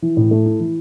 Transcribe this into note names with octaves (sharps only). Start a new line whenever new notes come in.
E3
A2
A3
E4
E3